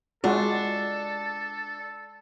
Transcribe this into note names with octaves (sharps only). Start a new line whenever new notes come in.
G#3 D4 F4 F#4 A4